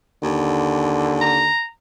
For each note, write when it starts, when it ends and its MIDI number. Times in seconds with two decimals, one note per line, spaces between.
0.23 1.50 39
0.23 1.51 50
1.21 1.64 82